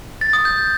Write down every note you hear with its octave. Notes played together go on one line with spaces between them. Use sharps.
A6
D#6
G6